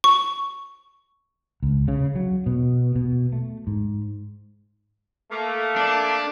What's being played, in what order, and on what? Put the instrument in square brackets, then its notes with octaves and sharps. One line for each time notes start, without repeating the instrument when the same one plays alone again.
[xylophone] C#6
[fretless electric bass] C#2
C#3
F#3
B2
B2
A3
G#2
[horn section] A3 A#3
[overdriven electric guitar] D4